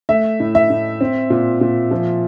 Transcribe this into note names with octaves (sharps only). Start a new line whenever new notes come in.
A3 E5
A2
E5
A2
C4
A#2
A#2
F3